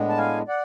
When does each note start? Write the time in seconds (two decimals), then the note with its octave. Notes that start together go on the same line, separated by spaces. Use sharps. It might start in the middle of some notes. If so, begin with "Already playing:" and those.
Already playing: A2 G#3 B3 D4
0.09 A5
0.18 F5 G#5
0.48 D5 F#5